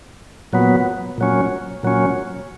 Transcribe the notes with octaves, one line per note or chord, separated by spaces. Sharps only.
A#2 F#3 B3
A#2 F#3 C#4
A#2 F#3 C#4